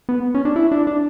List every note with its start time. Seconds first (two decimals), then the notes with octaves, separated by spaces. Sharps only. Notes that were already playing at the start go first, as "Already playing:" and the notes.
0.09 B3
0.35 C#4
0.45 D4
0.56 E4
0.72 D4
0.87 D4